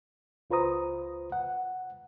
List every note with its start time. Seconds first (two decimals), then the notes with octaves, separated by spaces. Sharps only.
0.50 C#2 F4 B4 C5 A#5 D#6
1.32 F#5